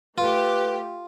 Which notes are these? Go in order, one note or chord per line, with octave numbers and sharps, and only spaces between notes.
A3 F4 G4 B4